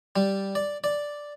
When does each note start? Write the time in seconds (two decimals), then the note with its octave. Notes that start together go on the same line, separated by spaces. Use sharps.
0.16 G3
0.55 D5
0.84 D5